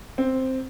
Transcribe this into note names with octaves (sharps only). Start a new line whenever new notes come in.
C4